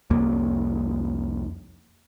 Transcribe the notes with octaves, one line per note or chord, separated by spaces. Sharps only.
C2 F2 A#3